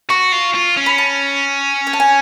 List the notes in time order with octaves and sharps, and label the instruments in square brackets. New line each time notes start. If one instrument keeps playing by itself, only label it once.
[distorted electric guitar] F#4 [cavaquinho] C#6
[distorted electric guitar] F4
F4
C#4
[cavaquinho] B5
A5
G#5
A5
G#5